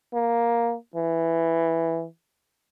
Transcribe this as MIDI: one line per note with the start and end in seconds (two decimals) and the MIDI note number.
0.14 0.75 58
0.96 2.05 52